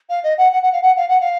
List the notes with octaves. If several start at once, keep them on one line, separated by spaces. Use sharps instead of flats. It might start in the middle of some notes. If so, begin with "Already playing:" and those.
F5
D#5
F#5
F#5
F#5
F5
F#5
F5
F#5
F5